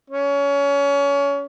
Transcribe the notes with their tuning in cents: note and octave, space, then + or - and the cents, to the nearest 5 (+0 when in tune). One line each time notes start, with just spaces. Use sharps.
C#4 +25